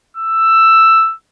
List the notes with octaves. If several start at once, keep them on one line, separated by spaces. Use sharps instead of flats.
E6